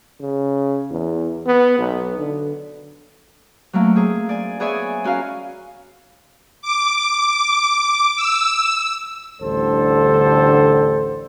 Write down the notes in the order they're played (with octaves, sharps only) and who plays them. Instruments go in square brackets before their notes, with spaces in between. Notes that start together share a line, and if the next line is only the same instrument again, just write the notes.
[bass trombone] C#3
E2
B3
B1
D3
[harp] F#3 A3 A#3 C#4
C4 G#4
D5 G#5
B3 G#4 C#5 D5 E5 G#5
C#4 F#4 A#4 F5
[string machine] D6
E6
[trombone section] A1 D2 D3 G3 A4 C5